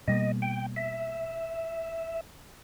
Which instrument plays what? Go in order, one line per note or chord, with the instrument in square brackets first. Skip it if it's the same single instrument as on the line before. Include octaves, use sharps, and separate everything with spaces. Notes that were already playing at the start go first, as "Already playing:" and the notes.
[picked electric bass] B2 G3 A#3 [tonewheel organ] D#5
[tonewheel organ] G5
E5